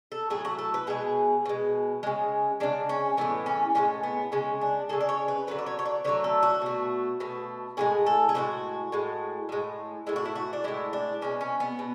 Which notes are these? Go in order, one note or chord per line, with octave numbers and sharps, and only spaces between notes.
A4
A2 F#3 A3 G#4
F#4
A4
B4
B2 G#3 G#4
B2 G#3
C#3 G#3
C#3 G#3 D4
C#4
A2 E3 G#3 B3
C#4
A2 E3 G#3 C#4
B3
C#3 G#3 C#4
D4
C#3 G#3 A4
D5
C#5
B4
D3 F#3 A3 B4
D5
C#5
C#5
D5
D3 F#3 A3 C#5
A4
F#4
B2 A3
B2 A3
A2 E3 G#3 G#4
A4
G#4
A2 E3 G#3 F#4
A2 G#3
A2 G#3
A2 G#3 E4
F#4
E4
F#4
D4
A2 G#3 E4
D4
B2 G#3 C#4
C#4
B3
B2